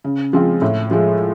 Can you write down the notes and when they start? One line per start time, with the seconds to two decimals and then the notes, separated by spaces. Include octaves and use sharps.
0.04 C#3
0.33 F3 G#3 C4 F4
0.62 A2
0.91 F3 G#3